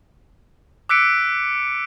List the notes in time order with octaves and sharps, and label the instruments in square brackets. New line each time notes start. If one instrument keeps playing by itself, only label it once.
[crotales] D6 E6 F#6 B6 C#7 D7